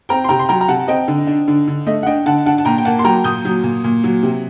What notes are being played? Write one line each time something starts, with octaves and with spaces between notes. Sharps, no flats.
C4 G5 A#5
C6
C3 G5 A#5
C6
F#3 G5 A#5
A#5
C3 F#5 A5
C4 D#5 G5
D3
D4
D3
D3
A3 D#5
F#5
D4 D#5 G5
D3 F#5 A5
D4 F#5 A5
A5
A#2 G5 A#5
G5
A#3 F#5 A5
C6
F#3 G5 A#5
A#2 D#6 G6
F#3
A#2
A#2
F#3
C3